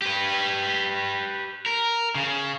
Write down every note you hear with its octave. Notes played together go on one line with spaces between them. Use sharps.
G4 B4
A#4
C#3